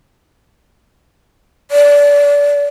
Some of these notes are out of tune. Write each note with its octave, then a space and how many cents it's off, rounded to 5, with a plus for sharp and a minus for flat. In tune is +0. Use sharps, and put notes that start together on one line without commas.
D5 -25